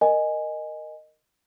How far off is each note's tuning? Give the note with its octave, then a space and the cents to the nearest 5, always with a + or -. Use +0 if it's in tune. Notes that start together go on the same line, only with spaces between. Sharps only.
A#4 +0 D#5 -10 G#5 +0